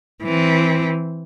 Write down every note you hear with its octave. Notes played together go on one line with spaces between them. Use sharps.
E3 C4